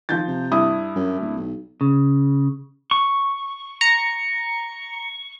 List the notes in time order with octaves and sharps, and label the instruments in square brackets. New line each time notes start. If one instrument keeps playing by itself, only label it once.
[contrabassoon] D#3 [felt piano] F3 G6 A6
[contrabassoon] C3
[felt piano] G2 E4 D#6
[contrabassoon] F#2
D1
B1
[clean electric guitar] C#3
[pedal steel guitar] C#6
[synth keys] A#5 C#7